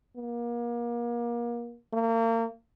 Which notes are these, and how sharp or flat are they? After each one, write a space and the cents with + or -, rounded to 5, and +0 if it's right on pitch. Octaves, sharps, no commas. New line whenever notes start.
A#3 +30
A#3 -35